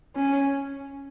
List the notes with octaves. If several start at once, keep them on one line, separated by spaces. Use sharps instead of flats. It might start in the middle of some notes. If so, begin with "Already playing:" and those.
C#4